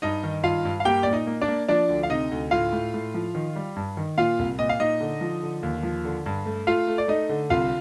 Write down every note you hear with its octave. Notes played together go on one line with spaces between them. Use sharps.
G2 D#4 D#5
D#3
G2 F4 F5
G2
F5
A#3 G4 G5
A#2 D5
D#4 D#5
A#3
D4 D5
A#3
F3 D4 D5
D2
F5
C3 D#4 D#5
D2
A2 F4 F5
A2
A2
F3
D#3
G3
G2
D#3
A#2 F4 F5
C2
A#2 D#5
F5
A#2 D#4 D#5
D3
F3
D3
D#2
F3
D3
G2
A3
A3 F4 F5
A3
D5
A3 D#4 D#5
D3
C2 F4 F5